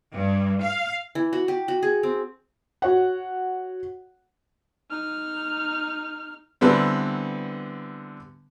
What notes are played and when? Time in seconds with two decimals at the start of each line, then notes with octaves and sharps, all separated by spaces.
0.14 G2
0.62 F5
1.15 E3
1.33 F#4
1.48 G4
1.68 F#4
1.83 G#4
2.03 C4
2.82 F#4 C#5 F#5
4.90 D#4 F6
6.61 D3 E3 G3 B3 C4